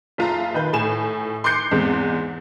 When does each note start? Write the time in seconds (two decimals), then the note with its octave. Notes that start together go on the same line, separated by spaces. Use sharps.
0.18 F#1 F4 A#5
0.54 D#3 B4 G6
0.73 A2 G#5 E7
1.44 C6 D6 F#6 G6 C7 C#7
1.71 E2 G#2 G#3 C4